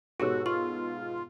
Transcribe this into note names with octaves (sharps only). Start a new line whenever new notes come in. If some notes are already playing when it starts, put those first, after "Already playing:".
G#2 B2 F#4 G4 A4 C#5 E6
F4 C#6